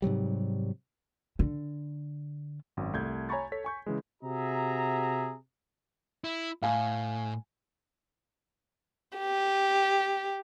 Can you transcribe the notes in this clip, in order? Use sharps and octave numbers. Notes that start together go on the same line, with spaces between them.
G#2 C3 F#3 G3
D3
G#1 F#2
C2 A3 G6 G#6
C#5 G#5 A#5 B5 C#6 A6
A4 C#5 B6
G#5 C#6 G6
C#3 E3 G#3
C3 F#4 G#4 E5 A#5
E4
A2 F5 G#5
G4